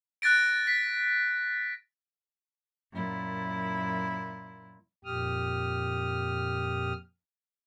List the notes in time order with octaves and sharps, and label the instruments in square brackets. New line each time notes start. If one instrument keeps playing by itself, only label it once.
[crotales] F#6 A6 A#6 D7
B6
[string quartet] F#2 A#2 E4
[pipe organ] F2 A#2 G4 D#6 F6